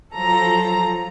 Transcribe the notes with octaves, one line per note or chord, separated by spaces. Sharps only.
F3 F#3 A4 A#5